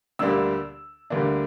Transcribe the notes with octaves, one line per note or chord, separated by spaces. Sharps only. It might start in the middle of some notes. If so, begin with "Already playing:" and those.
D2 D3 G3 A#3 D4 E6
D2 D3 G3 A#3 D4